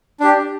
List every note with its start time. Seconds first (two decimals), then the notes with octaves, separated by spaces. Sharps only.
0.20 D4 G4